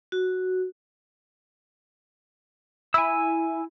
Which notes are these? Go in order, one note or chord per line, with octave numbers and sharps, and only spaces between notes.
F#4
E4 G#5 E6